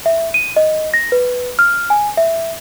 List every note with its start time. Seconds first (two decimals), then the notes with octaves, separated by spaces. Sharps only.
0.06 E5
0.34 D#7
0.56 D#5
0.94 A#6
1.12 B4
1.59 F6
1.90 G#5
2.17 E5